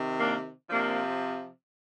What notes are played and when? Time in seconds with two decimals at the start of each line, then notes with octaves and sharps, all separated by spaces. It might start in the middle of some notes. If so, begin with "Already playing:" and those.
Already playing: C3 D#3
0.20 A#3 D4
0.70 C3 F3 A#3 D4